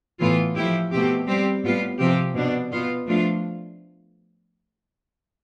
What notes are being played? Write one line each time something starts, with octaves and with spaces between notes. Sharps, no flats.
A2 E3 B3 F4
F3 A3 E4 G4
B2 A3 C4 G4
G3 C4 G4
A2 G3 B3 F4
C3 F3 C4 G4
B2 B3 D4
B2 B3 F4
F3 A3 D4 F4